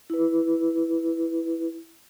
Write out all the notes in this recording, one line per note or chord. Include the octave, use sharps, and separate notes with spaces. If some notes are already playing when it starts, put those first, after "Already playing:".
E4 B4